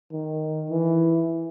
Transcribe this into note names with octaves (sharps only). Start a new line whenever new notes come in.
D#3
E3